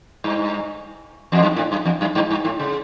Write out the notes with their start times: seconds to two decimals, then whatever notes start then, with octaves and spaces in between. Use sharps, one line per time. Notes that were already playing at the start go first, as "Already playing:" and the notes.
0.24 G2
1.32 E2
1.43 F#2
1.56 A2
1.72 F#2
1.85 E2
2.01 F#2
2.15 G2
2.31 G2
2.45 A2
2.59 C#3